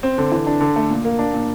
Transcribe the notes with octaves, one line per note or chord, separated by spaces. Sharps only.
C4
D3
E3
D4
D3
A3
A#2
A#3
D4
A#2